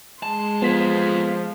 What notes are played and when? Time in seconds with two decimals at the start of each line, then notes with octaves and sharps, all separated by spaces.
0.23 G#3 A5 C6
0.62 F3 B3 F4 A4 B6